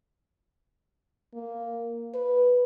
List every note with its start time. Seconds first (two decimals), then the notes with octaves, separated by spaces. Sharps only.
1.34 A#3
2.14 B4